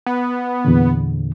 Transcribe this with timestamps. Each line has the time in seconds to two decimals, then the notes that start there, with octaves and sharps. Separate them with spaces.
0.06 B3
0.65 E2 A#2 D3